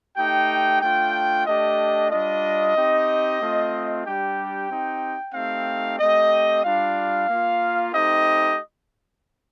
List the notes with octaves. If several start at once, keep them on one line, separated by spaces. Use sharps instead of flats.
A3 D#4 G4 G5
A3 D4 F4 G5
A3 D4 G4 D#5
G3 D4 F4 D#5
C4 D#4 G4
A3 C4 F4
G3 D4 G4 G5
C4 D#4 G4
A3 C4 D#4 G4 F5
A3 C4 G4 D#5
G3 D4 F4 F5
A#3 F4
A3 C4 D#4 G4 D#5